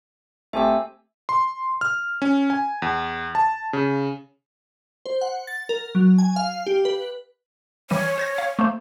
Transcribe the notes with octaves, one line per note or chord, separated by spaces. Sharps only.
D1 A3 C4 G4 E5 G#5 E6
C6
F6
C#4
G#5
E2
A5
C#3
C5
F#5
A6
A#4
F#3
G#5
F5
G4
B4
E3 G3 C#5 D#7
C5 G#6 A#6
F5
A3 A#3 C5